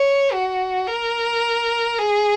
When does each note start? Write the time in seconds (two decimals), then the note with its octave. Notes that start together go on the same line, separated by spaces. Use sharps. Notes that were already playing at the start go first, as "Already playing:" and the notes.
Already playing: C#5
0.32 F#4
0.87 A#4
1.98 G#4